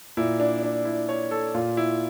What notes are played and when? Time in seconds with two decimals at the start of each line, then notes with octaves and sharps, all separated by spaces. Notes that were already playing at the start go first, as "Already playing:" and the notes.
0.17 A#2 E4
0.40 D4
0.63 D4
0.85 E4
1.09 C#5
1.31 A4
1.54 A#2 F4
1.77 E4